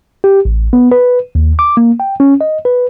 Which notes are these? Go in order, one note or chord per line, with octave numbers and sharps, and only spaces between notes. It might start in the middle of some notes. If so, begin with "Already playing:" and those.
G4
A1
B3
B4
D#2
D6
A#3
G5
C#4
D#5
B4